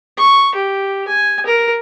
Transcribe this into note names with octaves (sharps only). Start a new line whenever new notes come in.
C#6
G4
G#5
A#4